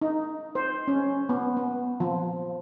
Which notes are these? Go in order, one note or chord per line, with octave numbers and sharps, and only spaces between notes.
D#4
C5
C#4
B3
B3
F3